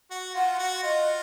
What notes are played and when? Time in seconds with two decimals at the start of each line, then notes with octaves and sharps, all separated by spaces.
0.11 F#4
0.35 F4 F#5
0.59 F#4
0.83 F4 D#5